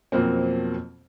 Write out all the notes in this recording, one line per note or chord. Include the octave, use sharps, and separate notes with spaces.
F2 B2 F#3 A#3 C4